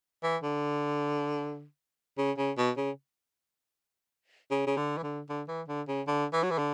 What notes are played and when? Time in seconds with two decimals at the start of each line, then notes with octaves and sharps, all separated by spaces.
0.23 E3
0.43 D3
2.18 C#3
2.38 C#3
2.57 B2
2.77 C#3
4.51 C#3
4.67 C#3
4.77 D3
4.98 E3
5.03 D3
5.29 D3
5.48 E3
5.68 D3
5.88 C#3
6.07 D3
6.33 E3
6.43 F#3
6.51 E3
6.58 D3